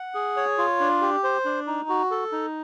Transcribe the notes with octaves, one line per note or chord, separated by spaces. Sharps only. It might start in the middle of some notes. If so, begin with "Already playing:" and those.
Already playing: F#5
G#4
C#5
F4
D4
G4
C5
D4
D#4
F#4
A4
D#4